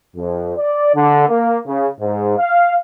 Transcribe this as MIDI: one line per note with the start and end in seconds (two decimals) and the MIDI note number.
0.16 0.53 41
0.56 0.92 74
0.94 1.27 50
1.28 1.58 58
1.65 1.87 49
2.00 2.35 44
2.38 2.75 77